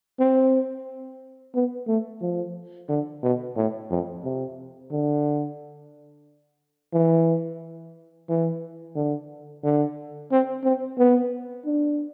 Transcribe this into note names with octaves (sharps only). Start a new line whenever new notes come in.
C4
B3
A3
F3
D3
B2
A2
F2
C3
D3
E3
E3
D3
D3
C4
C4
B3
D4